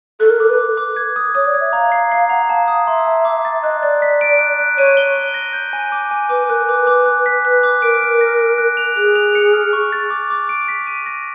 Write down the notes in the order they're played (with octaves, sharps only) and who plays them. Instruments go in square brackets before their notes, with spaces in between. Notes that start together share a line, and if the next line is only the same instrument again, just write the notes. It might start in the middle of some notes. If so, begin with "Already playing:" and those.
[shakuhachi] A4 [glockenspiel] F#6
[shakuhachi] A#4
[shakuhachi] A4 [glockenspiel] D6
[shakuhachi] B4
[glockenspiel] D6
D6
G#6
D#6
[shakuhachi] C#5 [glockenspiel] D#6
[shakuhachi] D5
[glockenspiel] G#6
[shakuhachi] E5
[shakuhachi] F5 [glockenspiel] A#5
[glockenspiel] C7
[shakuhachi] F5 [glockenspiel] C7
[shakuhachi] F#5 [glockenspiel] A#5
[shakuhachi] F5 [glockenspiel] A5
[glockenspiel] D#6
[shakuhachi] E5 [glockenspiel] C6
[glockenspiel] A5
D6
A6
[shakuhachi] D#5 [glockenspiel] F#6
[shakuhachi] D5 [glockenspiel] A6
[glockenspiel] B6
D7
F#6
F#6
[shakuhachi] C#5 [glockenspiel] D#7
[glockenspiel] G7
D#7
A#6
G6
G#5
D6
G#5
[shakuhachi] B4 [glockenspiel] D6
[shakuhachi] A#4 [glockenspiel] F#6
[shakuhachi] B4 [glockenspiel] D6
[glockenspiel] D6
F#6
B6
[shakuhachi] B4 [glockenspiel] F#6
[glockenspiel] D6
[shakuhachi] A#4 [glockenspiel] D7
[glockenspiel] D7
A#6
D7
F#6
F7
[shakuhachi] G#4 [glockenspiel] F#6
[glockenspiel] F7
C#7
F6
C#6
A6
D6
D6
D7
B6
D#7
A#6